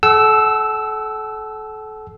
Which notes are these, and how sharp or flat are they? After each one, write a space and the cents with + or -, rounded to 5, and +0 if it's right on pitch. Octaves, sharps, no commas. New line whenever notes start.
A4 -30 F#5 +40 E6 +0